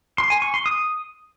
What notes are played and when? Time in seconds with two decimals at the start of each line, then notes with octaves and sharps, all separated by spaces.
0.18 C6
0.30 G#5
0.42 C#6
0.54 C6
0.66 D#6